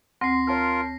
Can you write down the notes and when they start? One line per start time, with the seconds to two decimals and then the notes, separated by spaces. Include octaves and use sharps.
0.21 D2 C4 C6 A#6 C7
0.47 F4 A#4 C#5 A5 F6